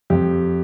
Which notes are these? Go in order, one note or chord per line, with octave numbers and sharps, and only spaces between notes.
F2 G4